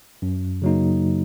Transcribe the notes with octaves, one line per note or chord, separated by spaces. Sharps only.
F#2
C#3 F#3 A#3 D#4